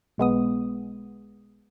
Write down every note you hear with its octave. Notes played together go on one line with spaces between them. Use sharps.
B1 G#3 B3 D#6